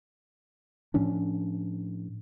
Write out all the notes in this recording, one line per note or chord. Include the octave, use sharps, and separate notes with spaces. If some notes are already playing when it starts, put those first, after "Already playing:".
A2 F3 C#4 D4